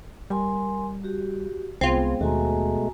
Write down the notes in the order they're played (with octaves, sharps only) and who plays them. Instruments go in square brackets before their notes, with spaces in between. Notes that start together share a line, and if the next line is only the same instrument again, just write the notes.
[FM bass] G3 [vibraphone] A#4 G#5 C6
[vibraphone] F#4 G4
[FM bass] C2 [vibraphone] G#3 B3 G#4 [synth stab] C4 F4
[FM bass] D#2 [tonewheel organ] B2 G#3 A3 [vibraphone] F#4 G#5 A#5